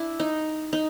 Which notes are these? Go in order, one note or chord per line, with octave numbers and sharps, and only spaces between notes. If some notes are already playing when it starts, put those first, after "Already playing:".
Already playing: D4 E4
D#4
D#4